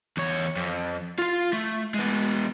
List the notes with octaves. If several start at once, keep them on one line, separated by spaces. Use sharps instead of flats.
E2 C#5
F2
F4 F5
A3
G#3 B3